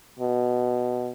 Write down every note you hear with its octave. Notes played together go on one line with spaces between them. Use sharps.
B2